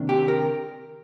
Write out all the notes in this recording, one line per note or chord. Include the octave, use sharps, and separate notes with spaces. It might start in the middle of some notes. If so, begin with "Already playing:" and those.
Already playing: C3 D#3 A#3 D4
G4
A#4